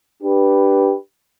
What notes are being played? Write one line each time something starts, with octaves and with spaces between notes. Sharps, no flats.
D4 G4 B4